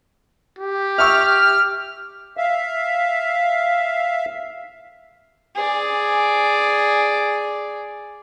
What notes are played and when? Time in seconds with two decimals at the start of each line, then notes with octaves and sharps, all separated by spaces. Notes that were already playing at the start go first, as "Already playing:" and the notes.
0.59 G4
0.98 E5 C#6 E6 F6
2.37 E5 F5
5.56 G#4 D5